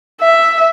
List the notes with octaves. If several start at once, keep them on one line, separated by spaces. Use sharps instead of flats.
E5